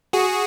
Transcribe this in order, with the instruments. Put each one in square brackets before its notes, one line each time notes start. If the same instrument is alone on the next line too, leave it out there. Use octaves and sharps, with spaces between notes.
[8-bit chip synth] F#4 G#4